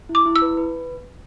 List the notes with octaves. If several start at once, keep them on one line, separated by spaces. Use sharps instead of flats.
E4
D6
E4
E6
B4
B4